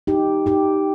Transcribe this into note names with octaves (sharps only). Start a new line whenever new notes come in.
D#4 G4
D#4 G4